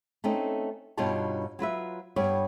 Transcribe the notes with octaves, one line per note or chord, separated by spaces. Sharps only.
A3 C4 C#4 D#4
G2 B2 D#4 F4 C#5 A5
F#3 F4 B4 E5
G2 G3 B3 C#5